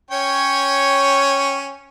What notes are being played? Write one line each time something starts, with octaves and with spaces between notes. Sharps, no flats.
C#4 C#5 G5